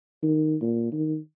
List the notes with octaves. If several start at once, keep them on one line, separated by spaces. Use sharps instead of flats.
D#3
A#2
D#3